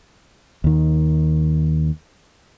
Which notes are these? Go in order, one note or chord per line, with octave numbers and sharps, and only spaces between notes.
D#2 D#3